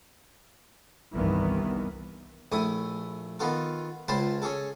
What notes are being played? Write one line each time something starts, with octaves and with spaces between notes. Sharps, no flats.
G1 C2 G2 D#3 E3 B3
A#1 A3 E4 D#6
D#3 B3 F4 A4
C#2 F4 C5 A5 B5 C6
C#4 G#4 A4